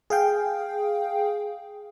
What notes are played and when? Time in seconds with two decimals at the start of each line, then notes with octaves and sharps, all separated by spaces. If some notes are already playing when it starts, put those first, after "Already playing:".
0.10 G#4 F5 G5